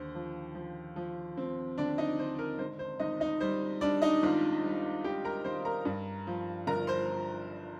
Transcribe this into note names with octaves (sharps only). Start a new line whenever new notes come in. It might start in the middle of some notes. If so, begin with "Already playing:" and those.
Already playing: D#2 D3 C5
F3
F3
F3
C4
D3 D4 D5
D#4 D#5
D3 C5
A#4
G#1 C5
C5
G#1 D#4 D#5
D#4 D#5
G3 C5
G3 D4 D5
D#4 D#5
G#1 F4 F5
G3
G#1 G4 G5
A#4 A#5
G#1 C5 C6
A#4 A#5
G2
F3
G1 A#4 A#5
C5 C6